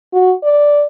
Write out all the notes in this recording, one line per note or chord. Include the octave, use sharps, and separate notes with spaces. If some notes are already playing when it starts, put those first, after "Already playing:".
F#4
D5